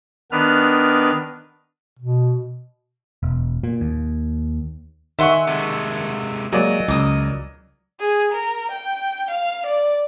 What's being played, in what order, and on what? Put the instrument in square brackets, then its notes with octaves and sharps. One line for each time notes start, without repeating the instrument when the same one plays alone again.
[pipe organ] D#3 B3 D4 B4 F6
[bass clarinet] B2
[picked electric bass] E1
A#2
D#2
[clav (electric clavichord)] D#3 [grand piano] E5 F#5 C#6 [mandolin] G#5 C6 E6
[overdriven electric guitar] C3 G#3 [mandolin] A4
[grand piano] F#3 D5 [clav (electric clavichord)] G#3 A#3 F#4 [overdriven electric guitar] D#5
[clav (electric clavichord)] C#2 [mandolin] A#3 D#6 E6
[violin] G#4
A#4
G5
F5
D5